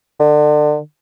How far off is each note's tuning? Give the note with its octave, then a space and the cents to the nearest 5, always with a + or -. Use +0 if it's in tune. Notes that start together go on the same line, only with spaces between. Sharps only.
D3 +30